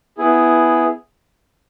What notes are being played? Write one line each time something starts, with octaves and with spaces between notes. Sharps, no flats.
B3 E4 G#4